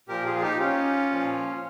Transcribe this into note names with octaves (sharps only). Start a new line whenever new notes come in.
A#2 F3 G4 A#4
F4 G#4
G#4
D#4 G4
C#4 F4
A#2 F3